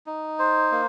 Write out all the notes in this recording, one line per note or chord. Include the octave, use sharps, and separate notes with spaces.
D#4
C5
A#3